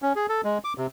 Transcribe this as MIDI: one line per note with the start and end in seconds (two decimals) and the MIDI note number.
0.02 0.13 61
0.16 0.26 68
0.29 0.41 69
0.44 0.58 56
0.64 0.73 86
0.78 0.87 48